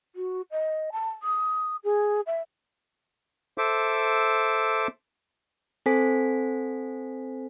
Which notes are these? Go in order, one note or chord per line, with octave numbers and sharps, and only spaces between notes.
F#4
D#5
A5
D#6
G#4
E5
A4 C5 E5 D6
C4 A4 C5 G#5 B6